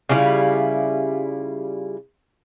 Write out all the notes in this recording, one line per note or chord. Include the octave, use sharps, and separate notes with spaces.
C#3 G3 E4 F4